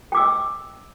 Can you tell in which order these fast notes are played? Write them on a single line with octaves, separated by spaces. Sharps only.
G5 D6 E6 D#5